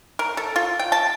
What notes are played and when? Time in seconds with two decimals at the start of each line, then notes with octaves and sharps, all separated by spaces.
0.19 A#4
0.37 A4
0.56 F4
0.79 G5
0.92 A5